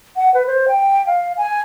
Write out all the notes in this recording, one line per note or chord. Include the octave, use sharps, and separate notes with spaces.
F#5
B4
C5
G5
F5
G#5